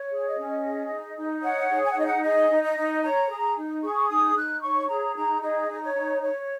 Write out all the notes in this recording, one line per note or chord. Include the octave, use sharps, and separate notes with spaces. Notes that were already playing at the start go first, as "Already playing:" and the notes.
Already playing: C#5
G#4
D#5
C#4
G#4
D#4
D#4
C#5 F#5
G#4
G#5
F#5
D#4 D#5
F#5
G#4 D#5
D#4
D#5
D#4
C#5 A#5
G#4
D#4
G#4 C#6
D#4 D#6
D#4 F#6
C#5 C#6
G#4 A#5
D#4 A#5
G#4 D#5
D#4 D#5
C#5
D#4
C#5